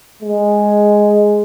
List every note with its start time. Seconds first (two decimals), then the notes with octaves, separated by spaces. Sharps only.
0.22 G#3